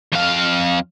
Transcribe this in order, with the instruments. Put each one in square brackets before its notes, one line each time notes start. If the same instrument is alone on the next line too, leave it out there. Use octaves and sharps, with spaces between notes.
[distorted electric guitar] F2 F5